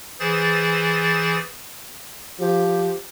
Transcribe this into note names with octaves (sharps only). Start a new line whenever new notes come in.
E3 G#4 C5 A6
F3 G4